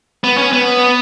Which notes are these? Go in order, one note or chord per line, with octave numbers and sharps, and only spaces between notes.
B3
C#4
B3